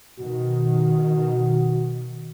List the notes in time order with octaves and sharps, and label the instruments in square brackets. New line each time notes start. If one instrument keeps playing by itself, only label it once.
[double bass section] B2 D#3 [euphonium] F#4